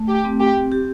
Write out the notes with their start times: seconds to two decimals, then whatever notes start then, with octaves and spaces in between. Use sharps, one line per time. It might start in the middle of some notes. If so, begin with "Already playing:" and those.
Already playing: A3
0.08 G4
0.25 C4
0.40 G4
0.72 G4